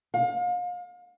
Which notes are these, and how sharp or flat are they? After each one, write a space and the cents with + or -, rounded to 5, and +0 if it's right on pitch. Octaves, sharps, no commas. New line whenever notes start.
F5 +35